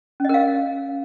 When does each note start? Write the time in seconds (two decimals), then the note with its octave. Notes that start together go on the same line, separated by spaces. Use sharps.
0.20 C#4
0.25 D#5
0.29 A#4
0.34 F5